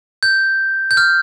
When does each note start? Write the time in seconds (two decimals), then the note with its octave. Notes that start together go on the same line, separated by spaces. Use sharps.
0.23 G6
0.91 G6
0.97 F6